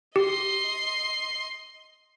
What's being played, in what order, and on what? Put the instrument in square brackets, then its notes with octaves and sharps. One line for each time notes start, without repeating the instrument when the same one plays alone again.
[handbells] G4 [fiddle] D#5 C6